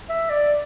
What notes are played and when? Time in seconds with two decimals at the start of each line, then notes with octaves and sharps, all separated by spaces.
0.09 E5
0.30 D5